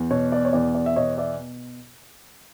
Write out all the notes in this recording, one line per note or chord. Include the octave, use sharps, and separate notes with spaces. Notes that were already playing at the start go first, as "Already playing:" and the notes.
Already playing: E2
B2 C#5
D5
C#5
E2 D5
D5
E5
B2 C#5 D#5
D5 E5